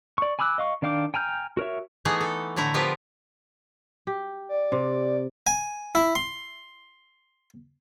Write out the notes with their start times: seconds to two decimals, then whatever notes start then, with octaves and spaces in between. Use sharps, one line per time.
0.18 D5 C#6
0.39 G#5 B5 D6 E6 F#6
0.58 D#5 F5 C#6
0.82 D#3 D4 F5 G5 D6
1.14 G5 G#5 A#5 F6 G6
1.57 F#4 A#4 C#5 E5
2.05 E3 A3 B3 D#4 G#4
2.20 A4
2.56 A2 D3 A3 E4 A#5
2.74 F3 B3 F4 G4 A#4 B4
4.07 G4
4.49 D5
4.72 C3
5.47 G#5
5.95 E4
6.15 C6